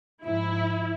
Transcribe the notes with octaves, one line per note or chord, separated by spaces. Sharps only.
G#2 F3 E4